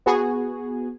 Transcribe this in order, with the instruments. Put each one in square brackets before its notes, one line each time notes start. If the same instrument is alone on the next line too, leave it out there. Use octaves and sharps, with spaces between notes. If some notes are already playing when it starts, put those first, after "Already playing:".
[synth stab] B3 F#4 G#4